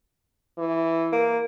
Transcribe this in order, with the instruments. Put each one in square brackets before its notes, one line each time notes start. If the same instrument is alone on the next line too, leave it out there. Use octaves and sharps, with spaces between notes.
[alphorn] E3
[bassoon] A#3